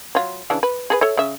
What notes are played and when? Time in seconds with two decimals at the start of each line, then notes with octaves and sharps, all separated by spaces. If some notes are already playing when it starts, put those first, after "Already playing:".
0.15 F#3 F4
0.50 C#3 E3 D4
0.63 B4
0.90 G#4 A4 B4
1.01 A4 C#5 E5
1.17 C#3 E5